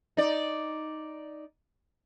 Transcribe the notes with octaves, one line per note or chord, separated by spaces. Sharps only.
D#4 D5